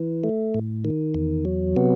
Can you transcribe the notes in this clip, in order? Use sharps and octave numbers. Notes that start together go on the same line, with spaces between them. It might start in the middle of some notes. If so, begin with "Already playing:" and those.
Already playing: E3
A3
A2
D#3
E2
F#3
C3 B3